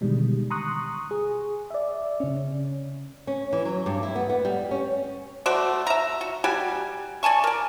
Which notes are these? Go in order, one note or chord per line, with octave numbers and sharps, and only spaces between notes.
B2 D3 D#3 G3 G#3
A#5 C6 C#6 D#6 F#6
G#4
D5 E5
C#3 C#4
C#4
E3
F#3
G2
E4
B3
B3
G3
C#4
A3 F#4 C5 D5
E5 A#5
F#4
G3 F#4 G4 G#5
D5 G#5 A5 C#6
A#4 D5